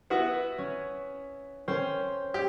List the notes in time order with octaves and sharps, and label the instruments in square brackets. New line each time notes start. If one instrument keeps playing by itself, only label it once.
[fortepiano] B3 E4 F#4
[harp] C#4
C#4 C5 G5
[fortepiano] G4